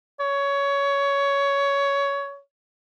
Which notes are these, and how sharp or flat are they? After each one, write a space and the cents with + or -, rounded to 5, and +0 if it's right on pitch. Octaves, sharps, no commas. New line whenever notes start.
C#5 +15